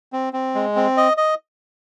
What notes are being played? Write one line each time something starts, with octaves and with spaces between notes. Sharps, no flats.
C4
C4
G#3
C4
D#5
D#5